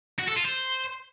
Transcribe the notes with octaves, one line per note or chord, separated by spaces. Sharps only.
F#4
A4
F4
C5